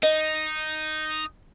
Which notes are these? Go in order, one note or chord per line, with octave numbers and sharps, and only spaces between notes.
D#4 D#5